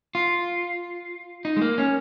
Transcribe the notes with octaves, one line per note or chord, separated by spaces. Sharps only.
F4
D#4
G#3
A#3
C#4